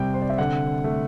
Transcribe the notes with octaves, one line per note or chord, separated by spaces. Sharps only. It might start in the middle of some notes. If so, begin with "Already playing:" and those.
Already playing: C3 G3 G5
C5
D5
E5
D3 F#5
A3